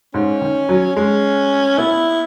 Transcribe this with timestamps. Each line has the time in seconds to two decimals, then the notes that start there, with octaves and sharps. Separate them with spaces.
0.14 G#2 C#4
0.41 D#3
0.69 F#3
0.96 G#3 C#4
1.78 B3 E4